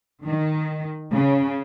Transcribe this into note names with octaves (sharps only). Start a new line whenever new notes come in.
D#3
C#3